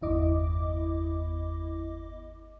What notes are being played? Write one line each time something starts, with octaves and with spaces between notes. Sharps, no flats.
G1 E2 E4 D#5 D6